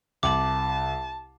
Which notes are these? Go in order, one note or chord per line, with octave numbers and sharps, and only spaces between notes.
C2 A5 D6 F#7